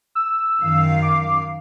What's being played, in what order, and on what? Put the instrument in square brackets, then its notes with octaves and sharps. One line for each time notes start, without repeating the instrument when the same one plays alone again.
[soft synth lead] E6
[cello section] F#2 D#3 F5
[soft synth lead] D6